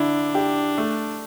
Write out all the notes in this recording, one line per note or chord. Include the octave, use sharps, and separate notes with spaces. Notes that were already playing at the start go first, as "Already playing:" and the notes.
Already playing: D3 D4 E4
G4
A3